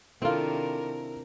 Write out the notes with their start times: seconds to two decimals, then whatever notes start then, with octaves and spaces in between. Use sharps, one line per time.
0.22 C3 D#3 C4 D4 E4 F4 A4 A#4